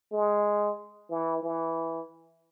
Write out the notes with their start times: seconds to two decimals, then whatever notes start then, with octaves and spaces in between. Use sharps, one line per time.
0.12 G#3
1.10 E3
1.43 E3